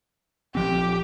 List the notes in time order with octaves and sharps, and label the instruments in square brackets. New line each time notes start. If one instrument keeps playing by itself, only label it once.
[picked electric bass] A#1 F3 C4 [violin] G4